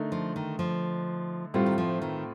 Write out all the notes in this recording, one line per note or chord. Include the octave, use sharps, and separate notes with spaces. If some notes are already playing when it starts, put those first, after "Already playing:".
Already playing: D3 A3 D#4 A#4
F3
D#3
F3
A2 G3 A3 C4 F4
D#3
F3
D#3